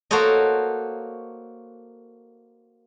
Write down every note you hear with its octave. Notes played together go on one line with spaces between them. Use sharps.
A#3 F#4 A4 C5 C#5 D#5